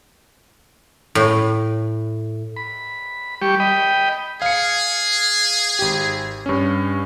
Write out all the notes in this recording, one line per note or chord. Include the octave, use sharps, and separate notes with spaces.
A2
B5
G3 G4 C#6
D#5 G5 B5
G#4 F5 C#7
G#1 G4
G2 C#4